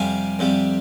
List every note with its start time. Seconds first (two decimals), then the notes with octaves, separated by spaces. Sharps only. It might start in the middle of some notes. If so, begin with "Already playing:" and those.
Already playing: F2 C3 G3 F5 G#5
0.39 F2 C3 G3